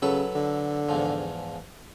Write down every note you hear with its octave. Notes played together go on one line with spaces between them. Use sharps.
C#3 F#3 A4 B4
D3
E2 G#2 F3